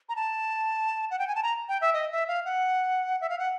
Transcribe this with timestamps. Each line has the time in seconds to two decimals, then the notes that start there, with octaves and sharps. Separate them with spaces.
0.09 A#5
0.16 A5
1.11 F#5
1.19 G5
1.28 G#5
1.35 A5
1.43 A#5
1.69 G5
1.81 E5
1.94 D#5
2.12 E5
2.28 F5
2.45 F#5
3.21 E5
3.29 F5
3.39 F#5